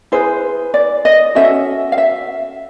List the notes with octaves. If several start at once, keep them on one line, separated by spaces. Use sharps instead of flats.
E4 G#4 B4 C5
D5
D#5
C#4 F#4 A4 E5
F5
E5